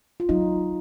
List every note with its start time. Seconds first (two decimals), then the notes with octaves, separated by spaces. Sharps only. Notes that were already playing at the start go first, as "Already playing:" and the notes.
0.20 F4
0.29 F#3 D#4